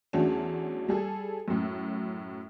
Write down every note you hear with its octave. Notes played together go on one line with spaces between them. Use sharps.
E2 F#3 A3 C#4 D4
G3 G#4 A4
F#2 A2